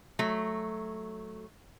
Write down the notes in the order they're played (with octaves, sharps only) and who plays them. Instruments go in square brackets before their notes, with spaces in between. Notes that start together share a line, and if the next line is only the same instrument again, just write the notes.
[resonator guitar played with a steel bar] F#3 A3